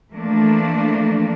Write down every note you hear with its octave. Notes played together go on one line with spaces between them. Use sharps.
E3 F3 A3 A#3 D4